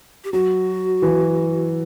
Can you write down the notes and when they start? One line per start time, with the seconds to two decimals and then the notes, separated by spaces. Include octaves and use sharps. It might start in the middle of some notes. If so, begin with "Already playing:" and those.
0.24 G4
0.33 F#3 F#4
1.02 E3